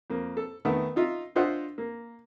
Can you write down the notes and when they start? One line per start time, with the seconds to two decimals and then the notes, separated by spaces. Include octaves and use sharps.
0.10 F2 A#3
0.37 A4
0.65 D#3 A3 B3 A#4
0.96 D#4 F4 E5
1.35 D4 F4 C5 D#5 E5 F#5
1.78 A#3